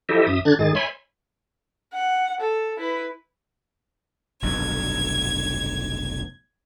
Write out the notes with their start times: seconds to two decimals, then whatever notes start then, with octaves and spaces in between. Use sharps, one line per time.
0.09 F3 E4 G4 A4 D#5 E5
0.27 F#2 E5 D#6
0.45 D3 D4 F#6 G#6 A6
0.59 G#2 D#3 G#3 G#4 A6
0.75 C#5 E5 G#5 B5 C6
1.93 F#5
2.41 A4
2.77 E4 B4
4.42 F1 B1 G2 G#6